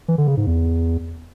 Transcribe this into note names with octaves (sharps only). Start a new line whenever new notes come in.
E3
D3
C#3
G#2
E2